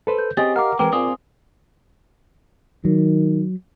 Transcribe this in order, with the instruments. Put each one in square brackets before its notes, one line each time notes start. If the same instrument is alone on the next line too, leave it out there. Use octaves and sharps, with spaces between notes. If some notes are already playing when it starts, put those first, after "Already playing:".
[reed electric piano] A4 B4 C5
[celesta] G6
[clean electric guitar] C4 C#4 G#4 [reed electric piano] G4 D#5 [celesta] A6
[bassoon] A#4 [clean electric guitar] F5 [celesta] F#5 D6
[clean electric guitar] E3 G#3 C4 [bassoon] A#4 [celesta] B4 G5 [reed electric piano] D6
[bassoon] A#2 [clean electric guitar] C4 F4 G#4 [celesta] D#6
[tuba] D#3 [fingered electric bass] F#3